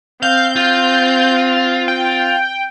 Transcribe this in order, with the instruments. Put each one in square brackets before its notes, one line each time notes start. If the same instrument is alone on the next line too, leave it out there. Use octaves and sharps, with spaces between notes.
[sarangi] C4 [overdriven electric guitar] F5 [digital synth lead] G6
[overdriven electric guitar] F4
[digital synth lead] G5